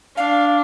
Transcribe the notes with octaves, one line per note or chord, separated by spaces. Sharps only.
D4 F5